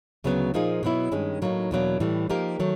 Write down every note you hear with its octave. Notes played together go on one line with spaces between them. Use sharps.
D2 C#3 F#3 B3
A#2 F3 A#3 D#4 G#4
B2 F#3 B3 E4
G2 D#3 G#3 C#4
A2 F#3 A#3 D#4
E2 B2 F#3 A#3 D4
A2 E3 G3
F3 A#3 D#4 G4 A#4
D#3 F#3 A3